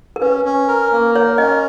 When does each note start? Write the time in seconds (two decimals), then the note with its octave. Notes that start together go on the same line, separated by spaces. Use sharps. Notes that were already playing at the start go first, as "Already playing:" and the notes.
0.16 A#4
0.21 C#4 B4
0.45 C#4
0.68 A#4
0.92 A#3
1.15 A#4 C#5
1.38 C#4 D#5